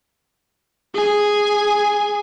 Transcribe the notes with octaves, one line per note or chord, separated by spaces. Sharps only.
G#4 G#5